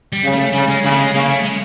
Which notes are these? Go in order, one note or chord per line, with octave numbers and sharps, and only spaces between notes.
G3
C#3
A3
C#3 G3
G#3
C#3 G3
A3
G#3
C#3 A#3
A3
G#3